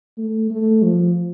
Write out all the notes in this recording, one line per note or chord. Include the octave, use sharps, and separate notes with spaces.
A3
A3
F3